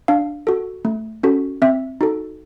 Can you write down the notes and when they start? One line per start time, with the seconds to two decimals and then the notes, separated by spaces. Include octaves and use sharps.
0.08 D4 F5
0.47 F#4 A4
0.85 A3
1.23 C#4 F#4 A4
1.62 C4 E5
2.01 D#4 F#4 A4